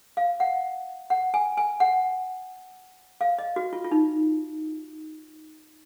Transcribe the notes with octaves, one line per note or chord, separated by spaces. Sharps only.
F5
F#5
F#5
G#5
G#5
F#5
F5
D#5
F#4
F4
F4
D#4